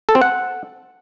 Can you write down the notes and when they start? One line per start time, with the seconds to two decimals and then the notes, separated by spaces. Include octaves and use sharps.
0.09 A4
0.15 C4
0.21 F#5